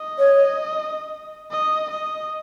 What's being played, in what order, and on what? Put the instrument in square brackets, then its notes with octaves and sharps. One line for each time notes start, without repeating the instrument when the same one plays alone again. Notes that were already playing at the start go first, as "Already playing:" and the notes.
Already playing: [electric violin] D#5
[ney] C#5
[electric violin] D#5
D#5